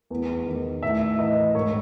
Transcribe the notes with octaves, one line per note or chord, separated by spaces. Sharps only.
E2
D#3
A2 E5
E3 D#5
G#2 C#5